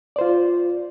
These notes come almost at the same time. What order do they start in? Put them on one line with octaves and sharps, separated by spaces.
D5 C5 F4